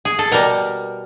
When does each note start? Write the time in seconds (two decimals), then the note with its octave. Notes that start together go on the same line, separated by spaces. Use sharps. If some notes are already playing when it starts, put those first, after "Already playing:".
0.05 G#4
0.19 A4
0.32 B2 G3 A#4